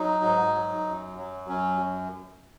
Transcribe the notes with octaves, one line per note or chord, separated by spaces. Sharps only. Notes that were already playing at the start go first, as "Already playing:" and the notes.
Already playing: F#3 D#4
G#2
F#3
F#2
F#3
F#2 C#4